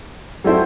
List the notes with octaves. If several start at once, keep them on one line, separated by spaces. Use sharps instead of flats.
F#3 C4 E4 A4 C5